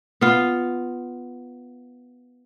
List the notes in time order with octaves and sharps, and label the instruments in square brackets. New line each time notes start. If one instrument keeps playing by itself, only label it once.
[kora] B3 F4